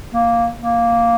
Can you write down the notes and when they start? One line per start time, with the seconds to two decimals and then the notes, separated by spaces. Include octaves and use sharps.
0.14 A#3
0.62 A#3